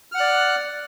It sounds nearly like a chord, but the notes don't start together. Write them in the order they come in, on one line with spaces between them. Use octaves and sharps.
F6 F#5 F#6 D5